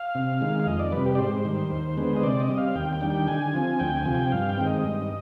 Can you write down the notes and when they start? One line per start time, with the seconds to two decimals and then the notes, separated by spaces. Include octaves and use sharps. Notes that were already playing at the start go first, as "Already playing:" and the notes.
Already playing: F5
0.15 C3
0.41 D#3 G#3
0.60 F5
0.66 F2 D#5
0.79 D5
0.92 C3 G3 B4
1.06 G4
1.15 D5
1.18 G#2 C5
1.45 D#3 G3
1.71 D#2
1.97 D3 G#3 B3
2.16 D#5
2.23 C3 D5
2.40 D#5
2.49 G3 C4
2.58 F5
2.75 D#2 G5
2.93 G5
3.01 D#3 G3 D4
3.10 G5
3.28 D3 G#5
3.54 F3 C4
3.79 D2 G5
3.97 G#5
4.06 C3 F3
4.15 G5
4.32 G2 F5
4.49 G5
4.58 D#3 G#3 C4
4.67 D#5
4.84 G2